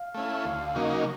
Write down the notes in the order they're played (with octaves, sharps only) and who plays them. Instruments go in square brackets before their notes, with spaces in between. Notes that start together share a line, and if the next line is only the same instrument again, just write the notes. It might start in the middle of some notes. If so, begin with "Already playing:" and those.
Already playing: [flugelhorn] F5
[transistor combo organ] A3 C#4 E4
D2
C#3 F#3 A#3 D#4